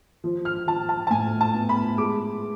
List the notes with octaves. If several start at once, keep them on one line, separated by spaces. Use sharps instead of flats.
F3
F6
F3 A5
A5
A5
A2 G#5
A5
B3
B5
G#3 D6